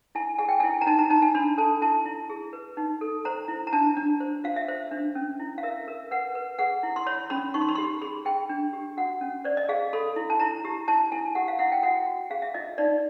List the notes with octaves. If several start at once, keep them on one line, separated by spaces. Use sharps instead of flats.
E4 G#5
G#4 G#5
G5
G#5
E4
A#5
D#4 A5
A#5
D#4 A5
G#5
D4 B5
A4 A5
E4 A5
E4
G#4
B4
D#4
A4
C5 A#5
E4
A#5
D4 A5
D4
C5
F4 F5
E5
C5
D4
C#4
E4
F5
A#4 E5
A#4
B4 F#5
B4
G#4 F#5
E4
C6
C#5 B5
C#4 B5
D#4 C#6
C6
B5
C6
G4
G#4 B5
G#4 G5
D4
G4
F#4 F#5
C#4
C5 D5
D#5
G#4 F5
A4 B5
E4
A5
E4 A#5
G4
E4 A5
E4 G#5
G4 F#5
F5
E4 F#5
G5
F#4 F#5
F#4
G#4 F5
E5
F4 D#5
D#4 D5